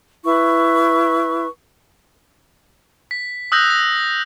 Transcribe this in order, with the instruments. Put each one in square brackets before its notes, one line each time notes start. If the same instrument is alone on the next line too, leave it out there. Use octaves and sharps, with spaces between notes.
[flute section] E4 B4 C#6
[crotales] B6
D#6 E6 F#6 G6 A#6
A#6